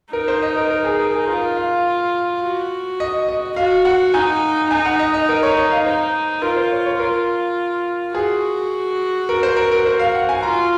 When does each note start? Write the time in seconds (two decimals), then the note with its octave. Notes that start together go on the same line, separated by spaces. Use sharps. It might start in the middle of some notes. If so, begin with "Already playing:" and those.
0.13 D#4 A#4
0.28 C5
0.42 D#5
0.56 A#4
0.70 A#4
0.85 G#4
0.99 A#4
1.14 G#4
1.28 F4 A#4
1.57 F5
2.42 F#4
3.00 D#5
3.28 D#5
3.56 F#4 F5
3.85 F#5
4.14 D#4 G#5
4.71 D#4 G#5
4.86 F#5
4.99 D#5
5.14 D#5
5.29 A#4
5.43 C#5
5.57 D#5
5.71 F5
5.85 D#4 C5
6.42 F4 A#4
6.57 C5
6.71 C#5
6.86 C#5
6.99 F4 A#4
8.14 F#4 G#4
9.29 A#4
9.43 C5
9.56 A#4
9.72 A#4
9.86 C5
9.99 F5
10.15 F#5
10.29 G#5
10.43 F4 A#5